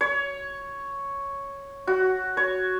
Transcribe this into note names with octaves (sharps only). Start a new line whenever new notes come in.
C#5
F#4
C#5